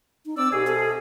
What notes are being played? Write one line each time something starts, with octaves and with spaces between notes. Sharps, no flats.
D#4
C4 D5 D6 E6
C2 B2 G4 G#4
A4